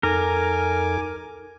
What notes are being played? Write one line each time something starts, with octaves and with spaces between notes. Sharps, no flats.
F2 D#4 A4 A#4 G#5 D6